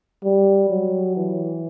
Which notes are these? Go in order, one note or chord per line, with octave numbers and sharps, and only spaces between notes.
G3
F#3
E3